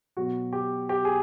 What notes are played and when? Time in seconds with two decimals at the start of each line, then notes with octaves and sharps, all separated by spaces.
0.17 B2 F#3 B3 F#4
0.53 G4
0.89 G4
1.05 G#4